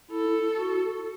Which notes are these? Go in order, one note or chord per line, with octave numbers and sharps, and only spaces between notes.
E4 A4
F#4